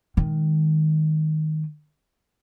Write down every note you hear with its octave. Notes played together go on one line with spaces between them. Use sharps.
D#3 G#3